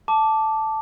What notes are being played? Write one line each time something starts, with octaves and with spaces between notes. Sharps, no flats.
A5 D6